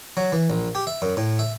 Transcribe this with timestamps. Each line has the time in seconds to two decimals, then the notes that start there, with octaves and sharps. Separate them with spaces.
0.17 F#3
0.32 E3
0.50 A#1
0.75 G4
0.87 E5
1.02 F#2
1.17 A2
1.39 E5